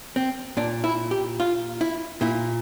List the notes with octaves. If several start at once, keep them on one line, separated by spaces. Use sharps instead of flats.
C4
A#2 D4
E4
G4
F4
E4
A#2 E4